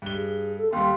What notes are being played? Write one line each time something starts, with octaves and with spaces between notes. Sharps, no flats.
G2 G7
G#4
A4
D#2 G3 C6